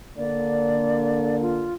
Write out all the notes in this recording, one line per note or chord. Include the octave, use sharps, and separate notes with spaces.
D3 A#3 D5
F4